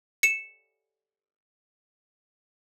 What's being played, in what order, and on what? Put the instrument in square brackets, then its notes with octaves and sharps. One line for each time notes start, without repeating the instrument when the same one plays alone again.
[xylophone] C#7 E7